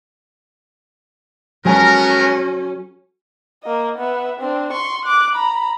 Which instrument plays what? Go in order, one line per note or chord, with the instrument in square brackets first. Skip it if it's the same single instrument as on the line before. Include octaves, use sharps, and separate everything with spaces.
[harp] F#3 A4 [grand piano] G#3 G#5 A#5 [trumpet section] B3 A#4 [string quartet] C#4
[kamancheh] A#3 D#5
B3 E5
C4 D4
C6 C#6
D6 F#6
A#5 B5